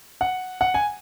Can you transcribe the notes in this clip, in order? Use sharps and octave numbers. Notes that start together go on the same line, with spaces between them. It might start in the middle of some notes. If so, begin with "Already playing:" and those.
F#5
F#5
G#5